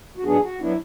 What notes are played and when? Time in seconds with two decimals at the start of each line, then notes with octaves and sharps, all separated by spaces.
0.17 F#4
0.25 G#2 F#3 B3 D4 G#4
0.43 F#4
0.60 F#3 B3 D4 E4